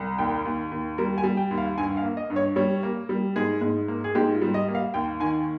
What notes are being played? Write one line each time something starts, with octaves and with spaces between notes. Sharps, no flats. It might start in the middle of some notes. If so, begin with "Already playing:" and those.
Already playing: C2
D#2 G5
D#2
D#2
G3 A#4
G#5
G3
G5
D#2
F5
G2 G#5
F5
A#3
D#5
G2
C#5
G3 C#5
A#3
G3
G#2 G#4
G#2
A#3
G#4
G#2 G4
F4
G3
D#5
A#3
F5
D#2 G5
D#3 G#5